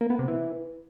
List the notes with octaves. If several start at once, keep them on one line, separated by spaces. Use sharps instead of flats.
A#3
B3
C3
E3